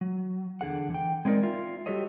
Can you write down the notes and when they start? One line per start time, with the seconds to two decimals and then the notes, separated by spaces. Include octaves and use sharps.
0.01 F#3
0.61 E2 D3 G#4 F#5
0.90 E3 G5
1.25 G#3 C4 D4 D#4 A#4 D5
1.43 F4 E5
1.86 G3 F#4 G4 A4 C#5 D#5